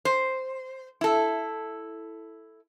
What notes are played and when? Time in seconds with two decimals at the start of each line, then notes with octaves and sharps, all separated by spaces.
0.05 C5
1.01 E4 A4